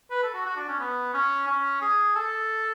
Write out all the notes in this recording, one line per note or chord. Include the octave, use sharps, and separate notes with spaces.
B4
A4
F#4
F#4
D4
C#4
B3
C#4
C#4
G#4
A4